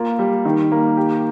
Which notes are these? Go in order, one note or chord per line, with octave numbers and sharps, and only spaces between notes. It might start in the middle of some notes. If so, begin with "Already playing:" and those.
Already playing: A#3 F4
G3
D#3
A#3
G4